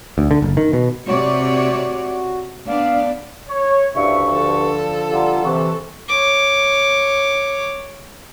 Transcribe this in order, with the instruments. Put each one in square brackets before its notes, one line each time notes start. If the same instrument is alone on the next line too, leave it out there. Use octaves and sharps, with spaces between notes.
[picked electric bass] D2
D3
F#1
D#3
B2
[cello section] C3 C#5 D5 [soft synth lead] F#4
[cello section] B3 D4 D5 [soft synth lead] F5
[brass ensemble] C#5
[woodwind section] D2 G2 C#6 [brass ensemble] C#3 E4 E5 [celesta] D5 F5
[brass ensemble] D3 F3 [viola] A4
[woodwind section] G3 F4 [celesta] F5 F#5 A#5
[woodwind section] C3 E3 [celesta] C#6
[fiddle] C#5 D6